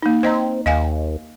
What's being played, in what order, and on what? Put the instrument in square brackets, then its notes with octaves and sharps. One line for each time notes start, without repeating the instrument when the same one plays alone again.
[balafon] A#3 D#4
[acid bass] C4 [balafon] C5 D#5 A#5
[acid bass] D#2 [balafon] D#5 F5 G#5